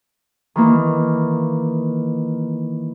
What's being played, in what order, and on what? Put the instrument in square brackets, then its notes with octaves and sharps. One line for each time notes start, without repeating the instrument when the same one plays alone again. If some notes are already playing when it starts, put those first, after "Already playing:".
[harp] D#3 E3 A#3